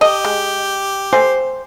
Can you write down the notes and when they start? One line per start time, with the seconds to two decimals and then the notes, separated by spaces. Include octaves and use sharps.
0.01 G4 A4 D#5
0.25 G#3
1.13 A3 C5 G#5